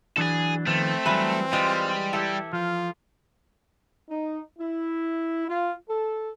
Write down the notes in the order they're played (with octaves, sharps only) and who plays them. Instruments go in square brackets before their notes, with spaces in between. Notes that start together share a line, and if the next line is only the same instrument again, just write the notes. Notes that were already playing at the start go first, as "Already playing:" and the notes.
[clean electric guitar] E3 F#3 D4 [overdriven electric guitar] G#4 A4
[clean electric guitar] D#3 F3 B3 [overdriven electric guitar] A3 [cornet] C4
[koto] E3 B4 [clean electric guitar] F#3 G3
[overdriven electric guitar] G3 [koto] G#3 [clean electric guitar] F4
[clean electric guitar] E4 G4 [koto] A4
[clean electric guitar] F3 [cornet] F4
[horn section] D#4
E4
F4
A4